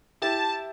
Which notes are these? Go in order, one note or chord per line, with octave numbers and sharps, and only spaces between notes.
E4 G4 A5